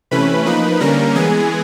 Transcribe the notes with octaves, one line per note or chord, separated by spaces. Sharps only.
C3 E3 A3 C#4 B4 B5
F3 A#3 D#4 B4 B5
D3 G3 A#3 C#4 A#4 A#5
E3 G#3 B3 G#4 G#5